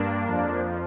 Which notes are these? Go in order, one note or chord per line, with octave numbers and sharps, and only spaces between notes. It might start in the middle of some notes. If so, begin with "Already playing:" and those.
Already playing: G2 A#3 D4
F2 F3